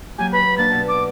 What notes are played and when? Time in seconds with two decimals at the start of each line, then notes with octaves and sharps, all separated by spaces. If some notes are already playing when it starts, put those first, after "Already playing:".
0.18 F#3 A#3 G4 G#5
0.32 B4 B5
0.58 A#3 D4 B4 A6
0.70 B2 A5
0.88 D6